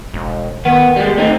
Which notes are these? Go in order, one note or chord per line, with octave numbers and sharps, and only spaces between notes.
E1
D#3 B3
G3 G#3
A3 C4 D#4